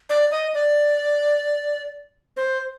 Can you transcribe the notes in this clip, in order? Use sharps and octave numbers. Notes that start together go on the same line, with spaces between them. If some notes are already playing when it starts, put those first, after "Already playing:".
D5
D#5
D5
C5